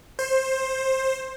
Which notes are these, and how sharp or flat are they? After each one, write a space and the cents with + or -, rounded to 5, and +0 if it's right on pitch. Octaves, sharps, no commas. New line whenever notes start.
C5 +15